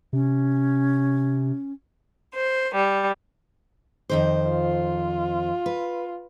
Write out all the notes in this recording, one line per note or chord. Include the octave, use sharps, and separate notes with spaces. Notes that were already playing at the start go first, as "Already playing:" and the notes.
C3 C#4
C5
G3
F2 D#3 C5
F4
B4